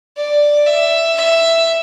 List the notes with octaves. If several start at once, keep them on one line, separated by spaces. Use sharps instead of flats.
D5
E5
E5